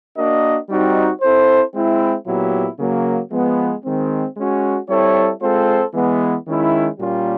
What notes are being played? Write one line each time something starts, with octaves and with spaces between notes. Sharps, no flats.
A#3 D4 F#4 A#4 D#5
G3 C4 D#4 F#4
C4 E4 A4 C5
G#3 C4 E4
A#2 F#3 B3 E4 G4
C#3 F#3 A#3
F3 G#3 B3
D#3 G#3 C4
G#3 C#4 F#4
G3 C4 E4 A4 C#5
G#3 C4 F4 A4 C5
E3 G#3 B3
D#3 G#3 C#4 E4
A#2 G3 A#3 C#4 F4